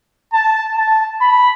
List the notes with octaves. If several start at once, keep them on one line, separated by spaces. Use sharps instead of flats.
A5
A5
B5